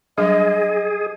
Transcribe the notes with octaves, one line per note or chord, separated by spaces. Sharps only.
F#3 G3 D4 G#4 D#5